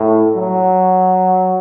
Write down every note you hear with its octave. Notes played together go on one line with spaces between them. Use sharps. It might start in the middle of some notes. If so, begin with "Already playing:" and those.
Already playing: A2
F#3